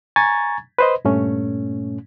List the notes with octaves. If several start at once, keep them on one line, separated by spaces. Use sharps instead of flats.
G#5 A#5 C#6 G#6 A6
B4 C5 D#5
G2 A#2 A3 C#4